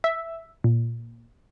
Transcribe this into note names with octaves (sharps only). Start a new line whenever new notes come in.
E5
A#2